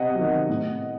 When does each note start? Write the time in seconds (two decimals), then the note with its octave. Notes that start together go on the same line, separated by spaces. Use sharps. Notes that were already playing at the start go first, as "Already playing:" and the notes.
Already playing: C3 D#5 F#5
0.14 D#3 F#3
0.49 A2